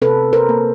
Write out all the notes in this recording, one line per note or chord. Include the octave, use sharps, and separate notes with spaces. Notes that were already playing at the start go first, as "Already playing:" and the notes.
C3 A4 B4
A#4 C5
A#3